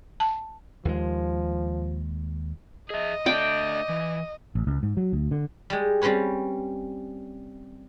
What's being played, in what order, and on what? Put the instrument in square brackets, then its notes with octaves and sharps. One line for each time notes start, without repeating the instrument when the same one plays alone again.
[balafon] A5
[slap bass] D#2 G#3 [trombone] F3
[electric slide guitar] G#4 E5 [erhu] D#5
[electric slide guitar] A3 D4 [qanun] D5 G5
[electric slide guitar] E3
[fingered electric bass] A1
C#2
G#2
F#3
D2
D3
[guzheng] G3 G#3
G3 C4 C#4 B4 C#5